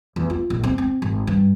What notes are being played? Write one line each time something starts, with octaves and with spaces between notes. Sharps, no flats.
E2
F4
A#1
C4
C4
G#1
G2